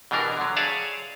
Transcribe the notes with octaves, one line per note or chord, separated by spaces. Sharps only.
B2 E3 G3 D4 A#4
D3 F#3
G#4 C#5 D5 E5 F5 A5